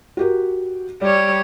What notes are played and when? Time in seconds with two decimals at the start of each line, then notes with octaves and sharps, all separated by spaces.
0.17 F#4 G4 A#4
1.01 G3 C#5 D5